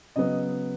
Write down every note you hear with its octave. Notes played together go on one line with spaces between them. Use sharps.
C#3 F#3 B3 D#5